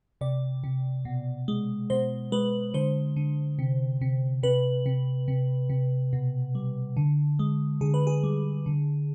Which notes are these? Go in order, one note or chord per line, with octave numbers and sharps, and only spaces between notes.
C3 D5
C3
B2
G#3
B2 C5
G#3 B4
D3 C5
D3
C3
C3
C3 B4
C3
C3
C3
B2
G3
D3
G#3
D3 G#4
B4
G#4
G3
D3